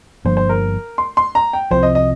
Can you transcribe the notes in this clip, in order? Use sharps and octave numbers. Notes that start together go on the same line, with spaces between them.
G1 G2 F3 A#3 C5
C5
A#4
C6
C6
A#5
G5
C2 C3 F3 C5
D#5
D#5